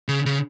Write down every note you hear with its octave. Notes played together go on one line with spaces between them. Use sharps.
C#3
C#3